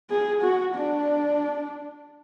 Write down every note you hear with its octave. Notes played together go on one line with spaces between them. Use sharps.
G#4
F#4
D4